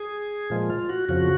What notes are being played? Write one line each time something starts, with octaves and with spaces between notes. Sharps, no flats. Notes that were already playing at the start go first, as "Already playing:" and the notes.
Already playing: G#4
A#2 F3 G#3
F4
F#4
F2 C#3 F3 F#4